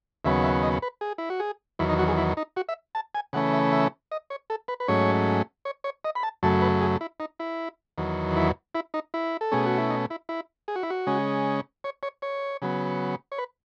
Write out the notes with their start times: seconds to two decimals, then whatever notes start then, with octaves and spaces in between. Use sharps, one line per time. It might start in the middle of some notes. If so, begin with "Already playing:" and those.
0.25 D#2 C#3 F#3 B3 E5
0.44 E5
0.63 D#5
0.82 B4
1.01 G#4
1.18 E4
1.30 F#4
1.40 G#4
1.79 E2 D#3 F#3 E4
1.89 D#4
1.99 F#4
2.08 G#4
2.18 E4
2.37 D#4
2.56 F#4
2.69 E5
2.95 A5
3.15 G#5
3.33 C#3 E3 A3 C#4 F#5
3.53 E5
3.72 E5
4.12 D#5
4.30 C#5
4.50 A4
4.68 B4
4.80 B4
4.88 G#2 F#3 A3 C#4 C#5
5.65 C#5
5.84 C#5
6.05 D#5
6.15 B5
6.23 A5
6.43 F#2 C#3 F#3 A3 A5
6.62 B4
6.81 G#4
7.01 E4
7.20 D#4
7.40 E4
7.98 E2 D#3 F#3
8.36 E4
8.75 E4
8.94 D#4
9.14 E4
9.41 A4
9.52 B2 A3 C#4 G#4
9.66 F#4
9.78 E4
9.90 D#4
10.10 E4
10.29 E4
10.68 G#4
10.76 F#4
10.83 E4
10.90 F#4
11.07 C#3 G#3 C#4
11.84 C#5
12.03 C#5
12.22 C#5
12.62 C#3 F#3 B3
13.32 C#5
13.38 B4